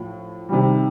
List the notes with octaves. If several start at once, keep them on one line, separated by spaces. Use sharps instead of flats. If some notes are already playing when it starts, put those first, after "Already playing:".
Already playing: A2 F3
C3 D#3 G3